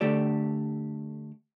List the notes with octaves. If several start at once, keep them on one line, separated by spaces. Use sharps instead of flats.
D3 A3 G4 A4 D5